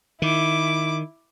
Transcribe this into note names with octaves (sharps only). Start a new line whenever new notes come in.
D#3 E4 D6